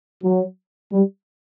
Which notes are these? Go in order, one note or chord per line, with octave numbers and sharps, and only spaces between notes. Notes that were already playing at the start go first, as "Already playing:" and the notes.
F#3
G3